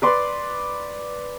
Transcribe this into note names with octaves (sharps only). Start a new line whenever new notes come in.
B4 D5 C6